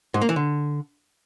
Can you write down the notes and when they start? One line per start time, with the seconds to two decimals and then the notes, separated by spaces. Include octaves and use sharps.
0.14 G#2
0.22 A#3
0.29 E3
0.36 D3